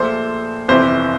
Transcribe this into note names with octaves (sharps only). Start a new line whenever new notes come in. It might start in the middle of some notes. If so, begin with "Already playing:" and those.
Already playing: A#1 A#2 A3 C5
G1 F2 C3 E3 C5